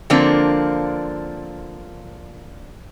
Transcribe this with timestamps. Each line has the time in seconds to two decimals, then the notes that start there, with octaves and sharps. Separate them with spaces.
0.10 D3 F3 A#3 C4 D4